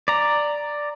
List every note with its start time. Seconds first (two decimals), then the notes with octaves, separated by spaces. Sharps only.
0.08 D5 A#5